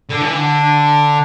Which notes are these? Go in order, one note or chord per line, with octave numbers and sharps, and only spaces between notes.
D3
E3
D3